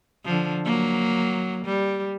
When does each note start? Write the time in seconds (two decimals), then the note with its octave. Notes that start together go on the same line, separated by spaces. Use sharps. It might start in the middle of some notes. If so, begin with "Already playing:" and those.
0.25 D3 F3
0.65 F#3 A#3
1.65 G3